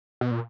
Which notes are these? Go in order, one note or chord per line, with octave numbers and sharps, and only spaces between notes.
B2
A#2